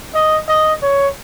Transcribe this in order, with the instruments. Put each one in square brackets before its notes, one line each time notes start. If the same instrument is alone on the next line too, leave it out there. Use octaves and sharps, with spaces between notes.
[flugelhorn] D#5
D#5
C#5